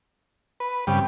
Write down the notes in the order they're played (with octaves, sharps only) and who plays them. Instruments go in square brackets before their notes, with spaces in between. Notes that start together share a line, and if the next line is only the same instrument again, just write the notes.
[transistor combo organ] B4
[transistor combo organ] G2 C#3 G3 [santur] C4